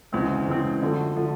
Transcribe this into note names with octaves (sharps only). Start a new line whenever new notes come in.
D2 C#3 E3 G#3 C4
D2 C#3 E3 G#3 C4
F#2 D3 F3 A3
D3 F3 A3